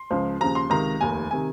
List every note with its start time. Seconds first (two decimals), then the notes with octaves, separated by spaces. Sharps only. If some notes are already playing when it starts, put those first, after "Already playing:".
Already playing: C6
0.11 C#2 C#3 F3
0.40 D#2 C#3 F3 A#5
0.55 C6
0.70 C#2 C3 D#3 A#5
1.01 F1 D#2 D#3 G#5
1.31 C3 D#3 G#5